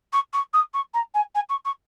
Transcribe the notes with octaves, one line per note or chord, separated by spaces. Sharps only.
C#6
C#6
D#6
C#6
A#5
G#5
G#5
C#6
C#6